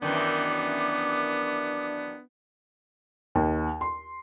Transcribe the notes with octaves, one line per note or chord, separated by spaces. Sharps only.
F#2 D#3 E3 B3 D4 D6
D#2
C6